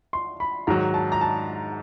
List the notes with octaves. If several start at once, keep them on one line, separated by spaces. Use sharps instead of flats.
C6
B5
G#2 D#3 F#3 A#5
A5
A#5
A5